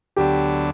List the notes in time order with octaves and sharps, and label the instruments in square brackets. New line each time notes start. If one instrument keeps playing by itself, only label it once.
[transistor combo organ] D2 D3 F#3 B3 D4 [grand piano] G4